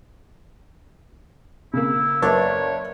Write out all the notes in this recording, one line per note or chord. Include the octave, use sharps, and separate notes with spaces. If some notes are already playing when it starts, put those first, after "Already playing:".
C#3 A#3 E4
F#1 D4 A#4 B4 C#5 E5